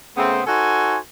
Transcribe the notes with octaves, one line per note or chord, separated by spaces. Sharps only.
C#3 A3 B3 C4
D#4 F#4 A4 C5 G#5